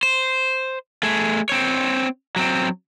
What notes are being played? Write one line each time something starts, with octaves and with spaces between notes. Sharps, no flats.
C5
A3 G#4
C4 C#5
F#3 C4